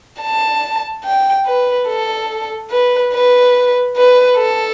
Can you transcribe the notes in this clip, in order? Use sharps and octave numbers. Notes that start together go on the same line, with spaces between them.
A5
G5
B4
A4
B4
B4
B4
A4